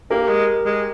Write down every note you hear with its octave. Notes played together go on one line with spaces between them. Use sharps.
A#3 G4 A#4
G#3
G#3